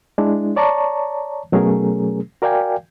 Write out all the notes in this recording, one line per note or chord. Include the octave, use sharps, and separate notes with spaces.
G#3 D4 E4
C#5 D5 A5 A#5 C#6
B2 F#3 A3 C#4 G#4 A#4
F#4 A#4 D5 F5 G5 G#5